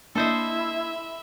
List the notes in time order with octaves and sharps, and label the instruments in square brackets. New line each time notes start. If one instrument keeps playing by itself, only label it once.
[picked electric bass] A#3 D4 [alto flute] E4 [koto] A4 C5 D#5 [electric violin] E5 B5